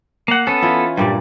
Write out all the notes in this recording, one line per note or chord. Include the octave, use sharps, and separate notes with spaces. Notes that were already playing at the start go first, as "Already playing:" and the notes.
A#3 F#5
B3 C#4 A4
E3 E4 F4
G2 A#2 G3 D5